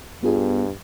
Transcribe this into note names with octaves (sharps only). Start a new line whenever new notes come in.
G2 B3 F4 G#4